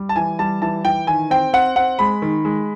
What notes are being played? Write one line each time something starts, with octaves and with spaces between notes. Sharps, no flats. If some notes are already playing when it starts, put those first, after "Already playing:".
Already playing: G3
A5
E3 G#5
G3 A5
E3 A5
E3 G5
D#3 G#5
C4 G5
C4 F#5
C4 F#5
G#3 B5
D#3
G#3